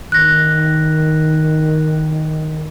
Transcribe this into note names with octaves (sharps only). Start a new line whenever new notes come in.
D#3 F#6 A#6